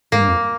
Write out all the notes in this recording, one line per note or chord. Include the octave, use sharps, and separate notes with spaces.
G#2 A#3
G2
F2